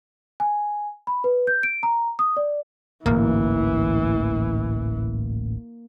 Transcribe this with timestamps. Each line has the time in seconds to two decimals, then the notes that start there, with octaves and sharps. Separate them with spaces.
0.40 G#5
1.07 B5
1.24 B4
1.47 G6
1.63 D7
1.83 A#5
2.19 D#6
2.37 D5
3.06 D1 A1 G#2 E3 A#3